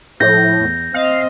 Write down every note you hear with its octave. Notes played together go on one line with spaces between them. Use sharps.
A2 F3 G6 A#6
E2
C4 D#5 F5